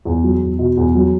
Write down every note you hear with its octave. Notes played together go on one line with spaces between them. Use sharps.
E2
F#3
E2
B2
E2
F#3